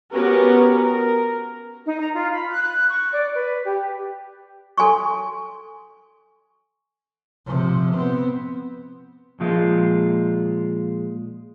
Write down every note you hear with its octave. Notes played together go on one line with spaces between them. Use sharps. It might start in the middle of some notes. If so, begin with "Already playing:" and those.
B3 C#4 F#4 G4 A#4 B4
A#4
D#4
A#5
F4
B5
F#6
F#6
C#6
D5
B4
G4
A4 G#5 C6 C#6
C3 F3
B3 C4
A#2 F3 G#3 F4